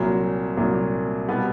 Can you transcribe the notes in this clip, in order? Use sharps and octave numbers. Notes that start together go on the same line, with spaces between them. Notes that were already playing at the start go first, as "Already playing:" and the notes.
Already playing: C2 A#2 F#3
C2 A#2 F#3
B2 G3 B3